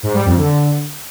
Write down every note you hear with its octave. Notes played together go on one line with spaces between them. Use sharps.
G#2
G3
F2
D3